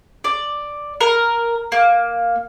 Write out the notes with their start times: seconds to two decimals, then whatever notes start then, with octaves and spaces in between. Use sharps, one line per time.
0.24 D5
1.01 A#4
1.72 A#3